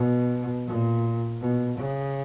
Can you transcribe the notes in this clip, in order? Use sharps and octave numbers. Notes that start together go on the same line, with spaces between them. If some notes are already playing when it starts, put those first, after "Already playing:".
Already playing: B2
A#2
B2
C#3